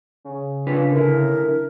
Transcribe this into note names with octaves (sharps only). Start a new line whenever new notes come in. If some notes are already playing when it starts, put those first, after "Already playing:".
C#3
D4 F4 B4
D3 E4 A#4